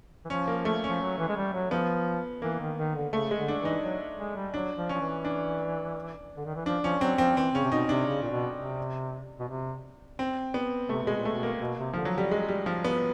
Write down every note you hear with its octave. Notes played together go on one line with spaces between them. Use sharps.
E3
F3 C#4
A#3
A3
F3 C#4
F#3
E3
G#3
G3
F#3
F3 B3
E3 A#3
D#3
D#3
D3
C#3 A3
G#3
D3
D4
E3 D#4
F#3
G#3
G3
F#3 D4
F3
F3 C#4
E3
D4
D3
D#3
E3
F3 D4
F3 C#4
F#3 C4
F3 C4
E3 C4
C#3 C#4
C3
B2 D#4
C3 D4
C#3
A#2
B2
C3
B2
C3
C4
B3
C3 A3
B2 G#3
A#2
B2 A3
A#3
B2
C3
D3 F3
F#3
D3 G3
G#3
G3
F3
B3